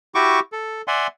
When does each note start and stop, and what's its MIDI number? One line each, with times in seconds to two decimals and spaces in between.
0.15 0.40 64
0.15 0.40 66
0.15 0.40 67
0.15 0.40 85
0.15 0.40 86
0.52 0.82 69
0.88 1.07 74
0.88 1.07 76
0.88 1.07 78
0.88 1.07 80
0.88 1.07 84